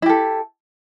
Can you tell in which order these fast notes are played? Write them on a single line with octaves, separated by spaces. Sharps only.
E4 G4 A4